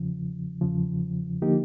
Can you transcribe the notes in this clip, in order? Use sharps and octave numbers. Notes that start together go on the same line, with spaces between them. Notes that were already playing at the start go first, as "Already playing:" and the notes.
Already playing: E2 C#3 F3
E2 C#3 F3
D3 F3 A#3 D#4 G4